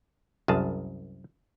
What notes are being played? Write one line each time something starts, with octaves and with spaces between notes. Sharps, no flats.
C2 F#2 G#4 A5